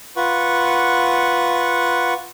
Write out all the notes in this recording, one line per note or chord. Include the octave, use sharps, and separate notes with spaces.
F4 B4 F#5 C#6